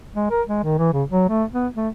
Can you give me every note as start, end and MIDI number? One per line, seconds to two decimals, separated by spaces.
0.15 0.27 56
0.30 0.42 70
0.48 0.62 56
0.63 0.78 51
0.78 0.89 52
0.93 1.04 49
1.10 1.27 54
1.29 1.44 57
1.53 1.67 59
1.75 1.89 57